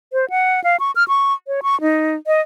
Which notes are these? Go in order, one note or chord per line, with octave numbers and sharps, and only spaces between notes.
C5
F#5
F5
C#6
F6
C#6
C#5
C#6
D#4
D#5